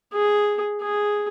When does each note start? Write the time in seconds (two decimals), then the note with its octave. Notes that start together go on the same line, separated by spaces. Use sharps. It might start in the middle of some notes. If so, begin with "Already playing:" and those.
0.13 G#4
0.81 G#4